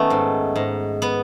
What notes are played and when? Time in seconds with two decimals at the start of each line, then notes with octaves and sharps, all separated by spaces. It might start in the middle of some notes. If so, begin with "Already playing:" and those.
Already playing: D#3 A3 B3 C#4 D#4
0.10 G#2
0.56 G#2
1.02 B3